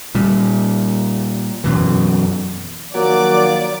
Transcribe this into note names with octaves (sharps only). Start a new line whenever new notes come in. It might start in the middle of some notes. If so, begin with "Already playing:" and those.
A#2 G3
F#2 B2 E3
D#3 F3 F#3 A#3 D5 D6